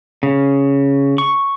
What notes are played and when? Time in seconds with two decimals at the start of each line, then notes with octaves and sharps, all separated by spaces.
0.23 C#3
1.18 C#6